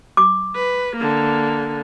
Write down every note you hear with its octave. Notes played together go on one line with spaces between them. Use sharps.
D6
B4
D3 A#3